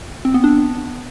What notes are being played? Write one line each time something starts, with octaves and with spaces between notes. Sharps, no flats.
C4
B3
D4